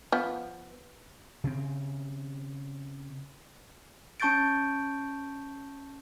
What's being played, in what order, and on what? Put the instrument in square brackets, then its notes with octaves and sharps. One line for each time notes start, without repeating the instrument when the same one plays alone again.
[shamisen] F3 B3
[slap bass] C#3 C4
[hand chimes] C#4 A5 C#6 G6 A6 D7